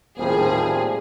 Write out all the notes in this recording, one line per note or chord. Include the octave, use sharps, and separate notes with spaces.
D#1 A2 F3 G3 A#3 C4 G#4